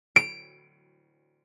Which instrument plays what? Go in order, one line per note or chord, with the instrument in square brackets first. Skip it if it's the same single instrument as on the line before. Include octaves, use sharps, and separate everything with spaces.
[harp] D7